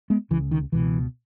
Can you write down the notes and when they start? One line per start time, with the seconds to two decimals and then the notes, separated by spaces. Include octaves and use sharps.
0.10 G#3 B3
0.30 C#2 C#3 E3
0.51 D#3
0.72 C#2 B2 E3